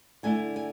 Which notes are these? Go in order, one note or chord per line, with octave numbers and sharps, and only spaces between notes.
D3 A3 E4 G#5
G#5